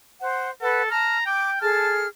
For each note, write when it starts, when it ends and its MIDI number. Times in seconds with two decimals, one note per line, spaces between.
0.22 0.50 72
0.22 0.50 78
0.62 0.91 69
0.62 0.82 71
0.62 0.82 78
0.91 1.17 81
0.91 1.24 82
0.91 1.17 89
1.26 1.60 79
1.26 1.50 86
1.62 2.07 68
1.62 2.07 69
1.62 1.96 81
1.62 2.07 89